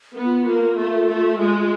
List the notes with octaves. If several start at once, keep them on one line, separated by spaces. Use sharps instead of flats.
B3
F4
A#3 F4
A3
A3
G#3